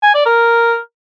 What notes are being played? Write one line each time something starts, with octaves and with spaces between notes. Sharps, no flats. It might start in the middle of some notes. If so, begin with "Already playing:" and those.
G#5
D5
A#4